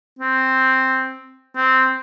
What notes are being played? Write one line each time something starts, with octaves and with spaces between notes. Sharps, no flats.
C4
C4